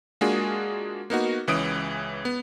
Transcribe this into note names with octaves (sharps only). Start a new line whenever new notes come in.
G#3 A#3 D4 F4 F#4 G#4
A#3 B3 D#4 F#4
C#2 E3 C#4 D#6 D7
B3